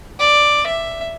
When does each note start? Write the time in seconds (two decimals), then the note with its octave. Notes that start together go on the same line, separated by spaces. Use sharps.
0.20 D5
0.67 E5